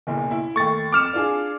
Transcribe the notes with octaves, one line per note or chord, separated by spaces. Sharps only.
F#1 B1 A#2
E4
D#2 A3 C#6 A6
F2 D6 F6 C#7 E7
D4 F4 G#4